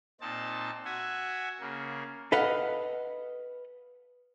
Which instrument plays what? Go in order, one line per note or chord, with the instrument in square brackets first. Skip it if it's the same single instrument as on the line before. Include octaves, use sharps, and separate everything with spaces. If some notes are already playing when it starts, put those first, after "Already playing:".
[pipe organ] A#2 C4 D#4 A5
F#4 E5 F#5 G#5
C#3 A#3
[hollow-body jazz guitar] A4 B4 D#5 F5 F#5